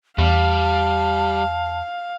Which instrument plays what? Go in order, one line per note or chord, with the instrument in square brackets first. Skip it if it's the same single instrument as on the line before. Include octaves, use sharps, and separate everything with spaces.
[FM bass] E2 [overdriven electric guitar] G3 [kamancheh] F5 [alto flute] A5